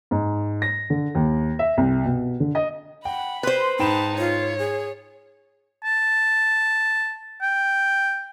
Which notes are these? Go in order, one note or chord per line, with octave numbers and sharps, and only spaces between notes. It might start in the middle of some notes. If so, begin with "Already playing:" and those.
G#2
A#6
D3
D#2
E5
C2
B2
D3
D#5
F#5 G5 B5
B4 C5 C6
G#2 D#4 G5 A5 B5 E7
F4 C#5
G#4
A5
G5